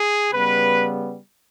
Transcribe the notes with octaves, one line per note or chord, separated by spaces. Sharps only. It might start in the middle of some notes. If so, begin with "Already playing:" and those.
Already playing: G#4
C#3 G3 B3 B4